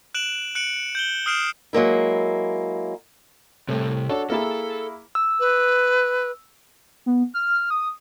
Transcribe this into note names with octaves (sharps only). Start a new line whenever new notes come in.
F#6 D7 E7 F#7
F#6 C#7 D7 F#7
G6 F#7 G7
D#6 F6 C7 D7 E7
F#3 G#3 A#3 E4
A2 C3 G3
D4 F#4 A4 C#5
A#3 E4 G#4 A4
E6
B4
B3
F6
D#6